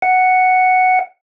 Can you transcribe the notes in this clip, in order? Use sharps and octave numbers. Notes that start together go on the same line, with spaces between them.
F#5